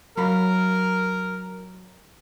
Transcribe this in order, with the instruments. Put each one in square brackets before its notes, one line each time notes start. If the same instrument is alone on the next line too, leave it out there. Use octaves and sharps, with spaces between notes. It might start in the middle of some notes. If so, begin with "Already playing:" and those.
[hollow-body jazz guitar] F#3 F5 B5 [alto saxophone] A#4